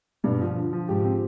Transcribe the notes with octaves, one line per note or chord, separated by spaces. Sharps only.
G2 B2
F3
D3
F3
G#2 G4
C4